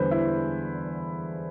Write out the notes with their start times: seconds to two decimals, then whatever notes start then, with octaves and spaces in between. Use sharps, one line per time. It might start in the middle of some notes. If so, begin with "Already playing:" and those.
Already playing: E2 D3 G3 B3 B4 C5
0.11 E4